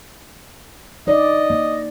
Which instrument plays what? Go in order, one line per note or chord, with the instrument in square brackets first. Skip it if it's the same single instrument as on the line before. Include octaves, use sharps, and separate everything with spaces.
[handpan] D#4 D5 [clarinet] D#5
[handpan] A#3